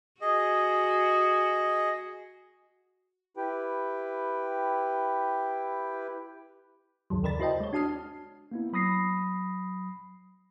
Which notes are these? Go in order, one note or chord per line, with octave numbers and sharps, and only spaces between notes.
F#4 G#4 D#5
E4 G4 B4 G5
D2 G2 D#3 F#3
D#2 C#3 A#4 D5 B5 A6
E4 F#4 C5 D#5 G5 A5
G#3 C#5
D4 F#4 A5 D#6 F6 C7
A#3 B3 E4
F#3 B5 D#6 A#6 C7